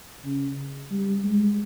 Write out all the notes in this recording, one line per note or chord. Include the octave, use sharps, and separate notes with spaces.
C#3
G3
G#3